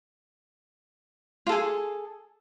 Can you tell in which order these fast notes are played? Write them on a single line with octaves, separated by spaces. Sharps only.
F4 A4 G#4